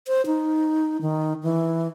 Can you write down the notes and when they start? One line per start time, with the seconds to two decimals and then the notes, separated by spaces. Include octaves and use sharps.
0.08 C5
0.26 D#4
1.02 D#3
1.43 E3